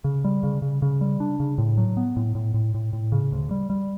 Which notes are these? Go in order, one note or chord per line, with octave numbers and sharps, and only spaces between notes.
C#3
G3
C#3
C#3
C#3
G3
D4
C#3
A2
F#3
B3
A2
A2
A2
A2
A2
C#3
D2
G3
G3